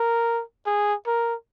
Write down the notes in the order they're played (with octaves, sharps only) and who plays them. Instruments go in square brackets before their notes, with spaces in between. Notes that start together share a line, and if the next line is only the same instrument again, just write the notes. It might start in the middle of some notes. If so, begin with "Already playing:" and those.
Already playing: [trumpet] A#4
G#4
A#4